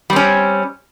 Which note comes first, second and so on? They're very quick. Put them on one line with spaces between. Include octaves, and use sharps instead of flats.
G3 C4 C#4